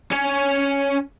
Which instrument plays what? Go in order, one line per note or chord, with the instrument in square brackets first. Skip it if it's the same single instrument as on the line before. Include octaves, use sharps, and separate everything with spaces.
[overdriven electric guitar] C#4 C#5